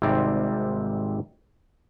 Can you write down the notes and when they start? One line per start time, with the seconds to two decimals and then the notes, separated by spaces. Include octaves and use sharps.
0.02 G#1 G#2 C3 G3 C4 D5